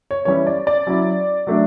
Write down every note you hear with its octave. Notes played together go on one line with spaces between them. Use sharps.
C#5
E3 G3 C#4 E4 C#5
D5
D5
F#3 C#4 E4
F#3 A3 D4